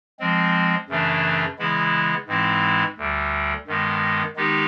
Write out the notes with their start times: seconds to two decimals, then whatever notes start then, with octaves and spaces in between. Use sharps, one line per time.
0.20 F3 G#3 C4
0.89 F#2 C#3 E3 A3 D4
1.59 C#3 E3 G#3 B3 E4
2.27 G#2 E3 G#3 C4 E4
2.98 D2 D3 G3
3.67 G2 D#3 G#3 B3
4.36 D#3 G#3 B3 D#4 G4